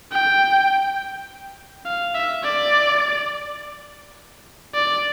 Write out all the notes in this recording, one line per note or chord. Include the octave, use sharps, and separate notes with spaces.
G5
F5
E5
D5
D5